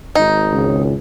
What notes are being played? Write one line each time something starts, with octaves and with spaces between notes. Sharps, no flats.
G#1 D#4
C#2